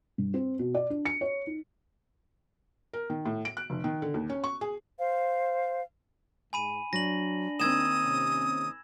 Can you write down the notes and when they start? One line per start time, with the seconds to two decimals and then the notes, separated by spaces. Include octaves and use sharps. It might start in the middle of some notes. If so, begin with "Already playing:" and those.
0.18 G2
0.34 C4
0.59 B2
0.74 D5
0.90 D4
1.05 C#7
1.21 C#5
1.47 D#4
2.93 A#4
3.10 D#3
3.25 A2
3.45 D7
3.57 F#6
3.70 F1
3.84 D#3
4.02 D3
4.14 D#2
4.30 C#4
4.44 C#6
4.61 G#4
4.98 C5 F5
6.53 G#2 G#5 B5 D#7
6.93 F#3 D4 A#6 F#7
7.60 D#2 C4 D#6 E6 G#6 E7
8.04 C3 C#4